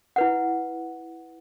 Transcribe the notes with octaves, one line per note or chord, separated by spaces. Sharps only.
E4 B4 F#5